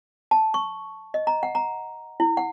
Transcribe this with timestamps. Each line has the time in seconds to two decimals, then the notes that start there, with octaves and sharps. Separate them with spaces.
0.31 A5
0.54 C#6
1.14 D#5
1.27 A#5
1.43 F#5
1.55 A#5
2.20 E4
2.37 F#5